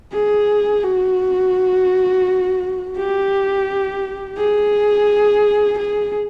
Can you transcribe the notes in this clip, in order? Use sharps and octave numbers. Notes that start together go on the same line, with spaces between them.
G#4
F#4
G4
G#4
G#4